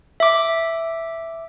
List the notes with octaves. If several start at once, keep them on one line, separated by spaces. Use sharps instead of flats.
E5 D6